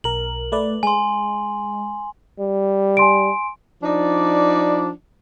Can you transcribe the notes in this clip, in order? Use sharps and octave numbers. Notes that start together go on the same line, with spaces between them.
B1 A#4 F#7
A3 B4 D5
G#3 G#5 C6
G3
G#5 C6 D7
F3 D4 D#4 D5